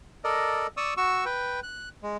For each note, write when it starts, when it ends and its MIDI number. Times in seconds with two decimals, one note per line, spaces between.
0.24 0.67 69
0.24 0.67 70
0.24 0.67 74
0.24 0.67 75
0.77 0.94 74
0.77 0.94 85
0.77 0.94 87
0.77 0.94 88
0.97 1.25 66
0.97 1.25 85
0.97 1.25 88
1.25 1.60 71
1.25 1.60 79
1.63 1.89 90
2.03 2.17 56